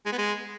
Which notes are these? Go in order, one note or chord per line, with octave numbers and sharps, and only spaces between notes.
G#3
B3
G#3